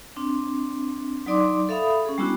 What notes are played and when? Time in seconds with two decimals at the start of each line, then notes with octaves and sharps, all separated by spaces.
0.17 C4 D4
1.26 F#3 D#4 D5 C6 D6
1.69 A4 E5 F5 B5 D#6
2.06 C#4 G#4
2.18 G3 G#3 B3 D4 E4 F#4